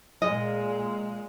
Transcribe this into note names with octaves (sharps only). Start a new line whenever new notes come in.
A#2 G#3 D#5